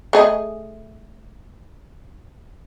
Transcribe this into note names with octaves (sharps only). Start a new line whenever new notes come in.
A3 G#4 D#5